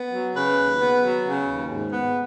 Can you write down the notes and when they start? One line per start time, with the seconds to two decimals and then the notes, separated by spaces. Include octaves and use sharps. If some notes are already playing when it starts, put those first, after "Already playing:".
Already playing: B3
0.13 F#3
0.35 C#3 B4
0.58 D#2
0.79 B3
1.02 F#3
1.25 C#3
1.47 D#2
1.68 G#2
1.92 B3